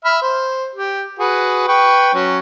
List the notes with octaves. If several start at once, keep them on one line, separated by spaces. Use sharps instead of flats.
E5 B5 F6
C5
G4
F#4 G#4 B4
B4 G5 C#6
F#3 C#4